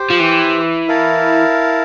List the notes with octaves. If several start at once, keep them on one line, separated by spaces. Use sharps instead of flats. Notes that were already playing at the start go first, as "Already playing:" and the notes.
Already playing: G4 C5 G5
F3
E3
E4 A#4 F5 A5